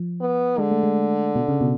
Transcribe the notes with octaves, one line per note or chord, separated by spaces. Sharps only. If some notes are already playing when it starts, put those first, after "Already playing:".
Already playing: F3
B3
D3 G#3
A3
G#3
B2
C#3
B2